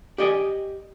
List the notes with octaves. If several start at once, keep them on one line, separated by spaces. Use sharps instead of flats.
G4 D5 D#5 G5 G#5